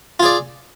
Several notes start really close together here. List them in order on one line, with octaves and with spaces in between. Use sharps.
F4 G#4 D5